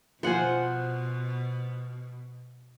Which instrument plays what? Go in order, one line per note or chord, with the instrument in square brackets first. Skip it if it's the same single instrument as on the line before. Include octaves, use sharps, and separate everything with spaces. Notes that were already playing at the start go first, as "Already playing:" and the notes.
[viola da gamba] B2 [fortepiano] F3 G#5 [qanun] C5 F#5